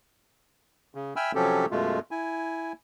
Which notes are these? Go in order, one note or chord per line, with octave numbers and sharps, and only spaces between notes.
C#3
E5 G5 G#5 B5 E6 F6
C3 F3 F#3 C#4 G4 A4
F#2 B2 G#3 A3 F4
E4 G#5